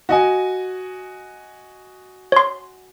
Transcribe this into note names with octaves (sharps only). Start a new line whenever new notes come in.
F#4 D#5 G#5
C#5 C6